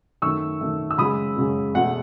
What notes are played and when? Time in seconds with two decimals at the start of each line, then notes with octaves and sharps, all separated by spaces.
0.22 F#2 D#3 A3 C#6 E6
0.61 F#2 D#3 A3
0.91 E6
0.98 F#2 C#3 G#3 B5 D#6
1.37 F#2 C#3 G#3
1.74 E2 B2 A3 F#5